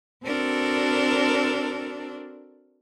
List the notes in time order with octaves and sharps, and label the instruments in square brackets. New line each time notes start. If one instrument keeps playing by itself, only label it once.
[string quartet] C4 D4 F#4 A4 A#4